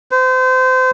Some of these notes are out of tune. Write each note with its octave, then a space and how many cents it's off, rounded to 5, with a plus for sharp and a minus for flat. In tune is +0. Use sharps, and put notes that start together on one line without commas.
C5 -30